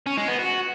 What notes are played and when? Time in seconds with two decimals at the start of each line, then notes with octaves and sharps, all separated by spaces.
0.06 C#4
0.17 G#3
0.28 B3
0.39 F#4